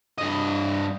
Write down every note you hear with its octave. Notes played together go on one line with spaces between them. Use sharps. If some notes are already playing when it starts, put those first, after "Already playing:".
G2 D#5